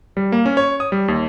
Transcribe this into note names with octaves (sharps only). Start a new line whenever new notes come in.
G3
A#3
C#4
C#5
D#6
G3
D#2